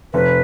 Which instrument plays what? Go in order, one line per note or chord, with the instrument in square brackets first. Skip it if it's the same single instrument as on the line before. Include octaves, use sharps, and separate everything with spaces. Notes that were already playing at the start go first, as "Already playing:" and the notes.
[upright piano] F1 [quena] B4